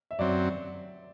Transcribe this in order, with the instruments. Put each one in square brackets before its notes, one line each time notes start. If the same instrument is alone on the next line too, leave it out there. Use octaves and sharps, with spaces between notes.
[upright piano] E5
[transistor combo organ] F#2 F#3 C4 [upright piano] D5